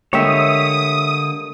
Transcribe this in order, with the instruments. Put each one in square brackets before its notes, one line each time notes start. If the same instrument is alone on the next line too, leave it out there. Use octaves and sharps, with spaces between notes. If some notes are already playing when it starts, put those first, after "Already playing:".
[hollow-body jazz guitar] D3 G5 [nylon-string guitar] G3 G#3 A#3 [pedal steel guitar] C#5 E5 [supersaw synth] D#6